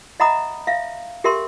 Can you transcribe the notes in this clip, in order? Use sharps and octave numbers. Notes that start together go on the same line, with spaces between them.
D#5 E5 F#5 A#5 B5 D#6
E5 F5
G4 A4 A#4 E5 G5 C6